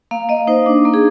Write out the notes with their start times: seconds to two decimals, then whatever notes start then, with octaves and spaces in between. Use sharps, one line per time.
0.11 A#3 F5
0.29 A#3 D#5
0.47 D#4 C5
0.66 D4
0.85 A#3
0.94 G#4